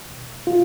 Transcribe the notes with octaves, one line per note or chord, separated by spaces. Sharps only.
F4